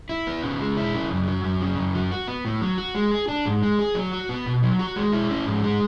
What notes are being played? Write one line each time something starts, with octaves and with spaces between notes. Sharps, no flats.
E4
B3
C#3
G#3
E4
C#3
F#2
F#3
F#2
C#3
F#2
F#3
F#4
B3
A2
F#3
F#4
G#3
G#4
D4
G#2
G#3
G#4
F#3
F#4
B3
B2
F#3
F#4
G#3
E4
C#4
G#2
G#3